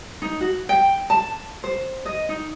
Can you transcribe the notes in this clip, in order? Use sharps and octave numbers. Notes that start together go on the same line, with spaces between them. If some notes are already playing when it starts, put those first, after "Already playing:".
D#4
F#4
G5
A5
C5
D#5
D#4